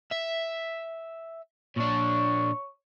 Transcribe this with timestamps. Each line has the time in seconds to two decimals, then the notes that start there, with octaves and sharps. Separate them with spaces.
0.12 E5
1.77 A#2 D4 C#5